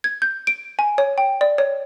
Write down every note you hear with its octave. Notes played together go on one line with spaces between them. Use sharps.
G#6
G6
D7
G#5
C#5
G5
D5
C#5